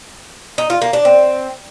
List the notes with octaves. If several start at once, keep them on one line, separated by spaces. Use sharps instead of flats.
D#4
F4
A#3
D4
C4